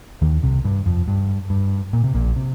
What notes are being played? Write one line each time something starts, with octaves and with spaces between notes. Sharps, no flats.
D#2 D#3
C2 C3
G2
F2
G2
G2
A#2
C3
A#1 A#2
C3